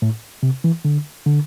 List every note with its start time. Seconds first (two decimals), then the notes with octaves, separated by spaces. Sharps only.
0.02 A2
0.43 C3
0.64 E3
0.85 D3
1.26 D3